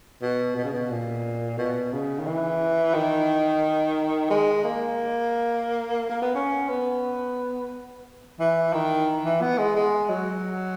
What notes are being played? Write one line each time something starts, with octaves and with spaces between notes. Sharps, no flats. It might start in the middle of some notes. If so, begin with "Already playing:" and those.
B2
B2
C#3
B2
A#2
B2
C#3
D#3
E3
D#3
G#3
A#3
A#3
B3
C#4
B3
E3
D#3
E3
B3
G#3
G#3
F#3